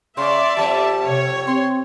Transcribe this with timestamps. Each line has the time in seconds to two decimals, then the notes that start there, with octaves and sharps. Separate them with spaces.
0.17 C#3 D5 E5 C6
0.57 F2 G3 A5
1.06 C3 C#5
1.47 C4 C6